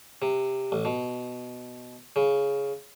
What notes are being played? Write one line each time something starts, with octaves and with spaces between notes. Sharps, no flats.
C3
A1
B2
C#3